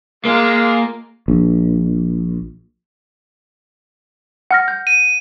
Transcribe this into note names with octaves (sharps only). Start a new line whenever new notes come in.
G#3 A#3 F4
A#1
F#5 F6 A#6
G6
D#7